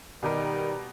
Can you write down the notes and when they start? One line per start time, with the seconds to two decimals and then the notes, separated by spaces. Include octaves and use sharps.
0.23 B2 D#3 G3 G4 A#5